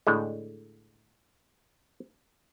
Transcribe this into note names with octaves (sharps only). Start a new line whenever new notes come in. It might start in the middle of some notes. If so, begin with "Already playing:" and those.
A2 D3 G#3